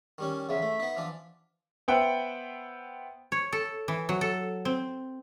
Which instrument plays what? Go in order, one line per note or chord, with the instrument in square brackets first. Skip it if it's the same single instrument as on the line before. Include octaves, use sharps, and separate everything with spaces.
[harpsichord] D#3 G3 C#4
[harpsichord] E2 C#3 F3 [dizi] E5
[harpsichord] A3
B3 D#4
E3 F3 D4
[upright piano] B3 B4 C5 E5 F#5 G5
[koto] C#5
A4
E3
F#3
A4
C4